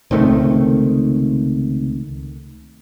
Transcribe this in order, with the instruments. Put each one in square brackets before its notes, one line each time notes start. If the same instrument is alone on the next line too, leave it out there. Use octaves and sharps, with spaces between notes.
[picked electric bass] C#2 C3 D#3 A3